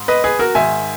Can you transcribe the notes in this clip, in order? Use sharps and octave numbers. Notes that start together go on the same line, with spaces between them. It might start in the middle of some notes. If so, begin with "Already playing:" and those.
Already playing: G#2
B4 D#5
G#4 B4
F#4 A#4
G#2 D#3 E5 G#5